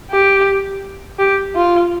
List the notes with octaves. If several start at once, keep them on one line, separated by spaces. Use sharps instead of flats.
G4
G4
F4